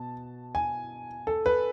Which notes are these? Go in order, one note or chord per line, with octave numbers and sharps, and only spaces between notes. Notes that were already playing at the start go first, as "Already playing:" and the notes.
Already playing: B2 A5
G#5
A4
B4